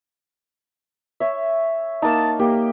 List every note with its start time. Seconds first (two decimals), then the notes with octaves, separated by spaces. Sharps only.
1.20 C#5 E5
2.02 A#3 D#4 A5
2.39 A#3 G4